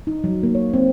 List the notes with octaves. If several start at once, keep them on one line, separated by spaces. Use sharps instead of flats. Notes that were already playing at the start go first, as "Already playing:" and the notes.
D#4
F#3
A#3
C#5
C4